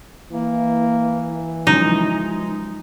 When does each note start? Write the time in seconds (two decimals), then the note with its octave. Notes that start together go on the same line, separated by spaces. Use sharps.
0.32 E3 A#3
1.67 C#3 F3 F#3 G#3 D#4